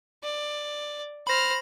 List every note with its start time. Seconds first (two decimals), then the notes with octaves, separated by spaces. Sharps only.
0.23 D5
1.27 C5 B5 F6 A#6